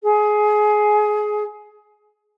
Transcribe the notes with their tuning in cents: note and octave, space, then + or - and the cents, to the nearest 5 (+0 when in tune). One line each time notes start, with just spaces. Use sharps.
G#4 +20